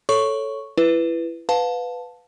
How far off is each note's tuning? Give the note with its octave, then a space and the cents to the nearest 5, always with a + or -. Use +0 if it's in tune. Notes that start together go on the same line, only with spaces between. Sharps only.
A4 +0 C#5 +0 C#6 +0
E4 +25 B4 +0
B4 +10 F5 +30 A5 +0